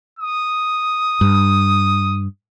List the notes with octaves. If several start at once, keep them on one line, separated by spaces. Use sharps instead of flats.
D#6
G2